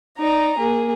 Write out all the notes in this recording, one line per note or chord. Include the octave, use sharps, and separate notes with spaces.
D#4 D5 A#5
A#3 G#4